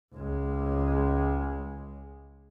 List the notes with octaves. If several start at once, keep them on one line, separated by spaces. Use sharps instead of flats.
C#2 G#3